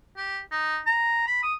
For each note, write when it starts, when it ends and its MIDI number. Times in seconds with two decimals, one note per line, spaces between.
0.16 0.39 67
0.51 0.79 63
0.86 1.25 82
1.27 1.42 83
1.43 1.54 87